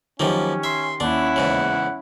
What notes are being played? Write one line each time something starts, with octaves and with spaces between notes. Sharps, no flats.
F#2 D#3 F3 A#3 C#4 G4
E5 C6
D#2 C#4 D4 E4 F#5
E2 G#2 C#3